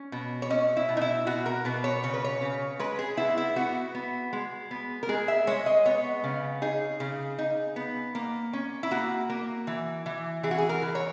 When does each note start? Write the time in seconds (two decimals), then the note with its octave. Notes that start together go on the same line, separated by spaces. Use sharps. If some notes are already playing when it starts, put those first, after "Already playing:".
Already playing: C#4
0.12 B2
0.42 C#5
0.50 C#4 D#5
0.77 E4
0.89 B2
0.97 D#4
1.01 E4
1.27 B2 F#4
1.46 A#4
1.65 B2 B4
1.84 C#5
2.03 C#3 C#5
2.14 B4
2.25 C#5
2.42 C#3
2.79 G#3 B4
2.99 G#4
3.17 B3 E4
3.37 E4
3.56 B3 F#4
3.95 B3
4.33 G#3
4.71 B3
5.03 A#4
5.09 G#3 G#4
5.28 E5
5.47 G#3 C#5
5.66 D#5
5.86 B3 C#5
6.24 C#3
6.62 D#4 G#4
7.00 C#3
7.39 D#4
7.76 B3
8.15 A#3
8.53 C#4
8.83 E4
8.91 A#3 F#4
9.30 A#3
9.67 E3
10.06 E3
10.43 E3 G#4
10.51 F#4
10.58 G#4
10.69 A#4
10.82 E3
10.95 C#5